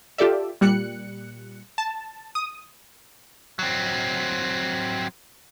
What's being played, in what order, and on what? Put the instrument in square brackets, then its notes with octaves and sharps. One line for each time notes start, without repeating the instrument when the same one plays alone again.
[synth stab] F4 G4 A4 D5 E5
A#2 G3 F#6 C#7
A5
D#6
[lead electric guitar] F#3 C4